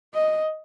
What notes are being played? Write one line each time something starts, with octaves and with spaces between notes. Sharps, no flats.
D#5